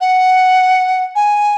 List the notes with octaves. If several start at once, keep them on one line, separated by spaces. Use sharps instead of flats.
F#5
G#5